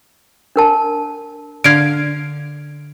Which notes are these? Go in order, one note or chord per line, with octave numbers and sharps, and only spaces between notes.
D4 A#4 A5
D3 F5 G#6 D7